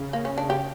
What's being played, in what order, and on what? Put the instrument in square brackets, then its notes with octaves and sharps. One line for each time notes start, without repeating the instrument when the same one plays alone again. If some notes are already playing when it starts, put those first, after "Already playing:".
Already playing: [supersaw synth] C#3
[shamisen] A#3
C#4
D4
G4